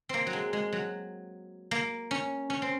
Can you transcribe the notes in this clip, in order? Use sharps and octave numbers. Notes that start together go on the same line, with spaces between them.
A#3 C4
F#3
G#3
G#3
F#3
A#3
C#4
C#4
C4